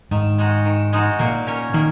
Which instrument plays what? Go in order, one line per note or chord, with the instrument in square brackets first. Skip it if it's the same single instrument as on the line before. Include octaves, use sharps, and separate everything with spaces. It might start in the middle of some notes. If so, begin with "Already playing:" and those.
[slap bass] G#2 [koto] D#3
[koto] G#3 D#4 F#4
D#3
G#3 D#4 F#4
[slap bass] A#2 [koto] A#3
[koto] C#4 A#4 C#5
[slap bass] D#3 [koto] A#3